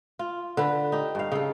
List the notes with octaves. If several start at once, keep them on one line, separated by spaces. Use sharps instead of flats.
F4
D3 B4
D#4 G4
G2 F5
C#3 A4